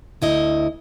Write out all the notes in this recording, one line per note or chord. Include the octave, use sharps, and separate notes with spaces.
D2 E4 D#5